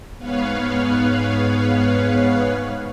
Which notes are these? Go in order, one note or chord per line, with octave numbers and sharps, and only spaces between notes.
G#2 B3 B4 C#5 F5